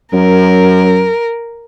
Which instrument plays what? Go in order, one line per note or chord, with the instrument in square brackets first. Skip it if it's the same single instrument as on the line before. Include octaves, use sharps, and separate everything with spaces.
[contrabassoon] F#2 [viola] A#4